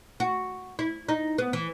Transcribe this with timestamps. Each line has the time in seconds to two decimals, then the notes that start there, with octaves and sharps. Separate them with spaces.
0.20 F#4
0.79 E4
1.09 D#4
1.38 B3
1.53 E3